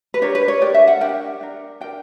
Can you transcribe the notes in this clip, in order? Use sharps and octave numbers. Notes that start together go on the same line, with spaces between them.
B4
D4 G4 A#4 C#5
B4
C#5
D4 G4 A#4 D5
E5
F#5
D4 G4 A#4 G5
D4 A#4
D4 A#4 G5